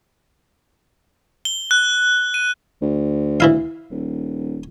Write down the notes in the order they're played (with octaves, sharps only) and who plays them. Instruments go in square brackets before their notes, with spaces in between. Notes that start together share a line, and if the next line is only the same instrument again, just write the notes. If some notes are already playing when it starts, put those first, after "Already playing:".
[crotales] G7
F#6
D#7
[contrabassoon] D2
[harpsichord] E3 E4 F5
[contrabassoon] D#1